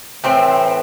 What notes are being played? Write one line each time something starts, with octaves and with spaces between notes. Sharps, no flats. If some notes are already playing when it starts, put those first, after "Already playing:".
A2 E3 A3 C4